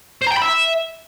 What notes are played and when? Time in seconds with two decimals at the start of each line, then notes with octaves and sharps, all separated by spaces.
0.22 C5
0.27 A#5
0.32 G5
0.37 B5
0.42 E5